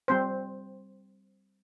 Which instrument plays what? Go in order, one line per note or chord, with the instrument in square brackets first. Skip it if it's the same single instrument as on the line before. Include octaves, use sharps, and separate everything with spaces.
[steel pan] G3 C4 C5